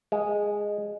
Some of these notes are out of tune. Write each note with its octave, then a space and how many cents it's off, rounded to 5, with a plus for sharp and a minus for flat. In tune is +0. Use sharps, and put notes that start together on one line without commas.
G#3 -5